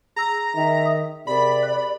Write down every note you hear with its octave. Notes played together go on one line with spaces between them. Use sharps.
G#4 A#5 E6
D#3 E5
D#6
C3 G#4 A#4 D5 B5
F#6